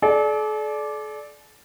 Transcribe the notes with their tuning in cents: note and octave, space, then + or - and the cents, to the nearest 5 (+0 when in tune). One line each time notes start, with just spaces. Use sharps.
A4 -45 D5 +0